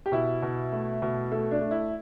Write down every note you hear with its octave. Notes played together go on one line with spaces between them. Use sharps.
G4
B2 E4
B2
A3
B2
A3 A4
D4
A3
E4